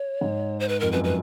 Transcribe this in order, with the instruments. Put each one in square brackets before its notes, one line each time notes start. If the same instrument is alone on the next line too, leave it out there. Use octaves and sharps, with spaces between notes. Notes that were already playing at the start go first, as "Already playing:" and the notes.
Already playing: [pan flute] C#5
[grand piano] G#2
[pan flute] C5
B4
[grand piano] F2 [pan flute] A#4
[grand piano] F#2 [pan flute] B4
[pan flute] B4